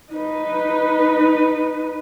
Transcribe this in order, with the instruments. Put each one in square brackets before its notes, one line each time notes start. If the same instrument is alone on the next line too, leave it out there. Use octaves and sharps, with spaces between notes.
[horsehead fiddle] D#4 B4